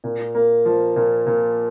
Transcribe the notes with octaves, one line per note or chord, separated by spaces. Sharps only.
A#2
A#3
F3
A#2
A#2